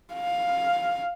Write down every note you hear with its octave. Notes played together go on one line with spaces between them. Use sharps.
F5